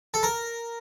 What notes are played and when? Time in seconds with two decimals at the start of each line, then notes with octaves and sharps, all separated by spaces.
0.14 A4
0.23 A#4